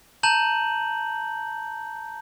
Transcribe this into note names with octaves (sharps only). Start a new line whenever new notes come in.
A5 A#5 G6 F#7